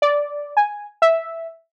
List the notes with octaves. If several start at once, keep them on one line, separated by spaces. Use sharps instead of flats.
D5
G#5
E5